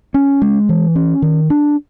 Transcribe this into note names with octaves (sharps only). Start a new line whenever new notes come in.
C#4
G#3
E3
C#4
D#3
D4